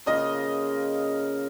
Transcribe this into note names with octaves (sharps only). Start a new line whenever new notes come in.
C#3 A#3 F4 G#4 D#5